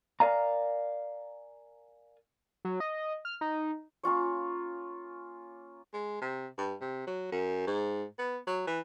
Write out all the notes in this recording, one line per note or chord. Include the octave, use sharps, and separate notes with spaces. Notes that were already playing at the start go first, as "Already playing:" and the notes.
A#4 D5 F5 G#5 A#5
F#3
D#5
F6
D#4
A#3 C#4 F4 C#5
G#3
C3
G2
C3
F#3
F#2
G#2
B3
F#3
E3